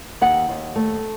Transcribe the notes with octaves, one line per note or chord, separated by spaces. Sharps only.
D#2 F#5
D#2
A3